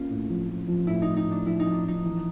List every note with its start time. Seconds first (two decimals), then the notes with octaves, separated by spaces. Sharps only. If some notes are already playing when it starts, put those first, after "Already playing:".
Already playing: A#3 C#4 F4
0.10 A2
0.29 F3
0.48 F3
0.68 F3
0.87 A2 E4
1.02 A2 D#4
1.17 D#4
1.27 A2 D4
1.46 F3 E4
1.59 D#4
1.65 F3
1.73 D4
1.85 F3 D#4
2.04 E3